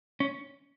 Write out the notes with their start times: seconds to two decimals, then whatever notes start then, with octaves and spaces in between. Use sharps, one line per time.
0.20 C#4